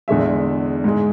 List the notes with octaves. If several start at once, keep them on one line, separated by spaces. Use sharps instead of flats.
E2 D3 G#3 E5
G#2 G#3